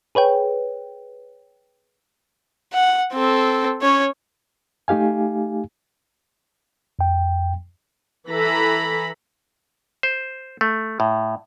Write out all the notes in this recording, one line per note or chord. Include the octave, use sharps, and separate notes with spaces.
G#4 B4 C#5 G5
F#5
C4 A4
C#4 C#5
A3 D#4 G4 F5 G#5
F2 G5
E3 A4 B4 A#5 B5
C5
A3
A2